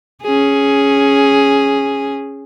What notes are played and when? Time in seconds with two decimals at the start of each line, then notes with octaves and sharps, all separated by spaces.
0.23 C#4 G#4